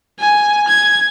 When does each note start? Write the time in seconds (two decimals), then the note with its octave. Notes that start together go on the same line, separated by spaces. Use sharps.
0.19 G#5
0.67 G#6